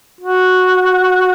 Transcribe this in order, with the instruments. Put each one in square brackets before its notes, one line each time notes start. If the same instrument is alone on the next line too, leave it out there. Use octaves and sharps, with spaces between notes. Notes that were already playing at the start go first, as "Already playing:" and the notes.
[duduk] F#4